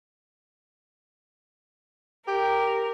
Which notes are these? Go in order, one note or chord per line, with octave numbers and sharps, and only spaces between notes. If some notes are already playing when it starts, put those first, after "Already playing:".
G4 A#4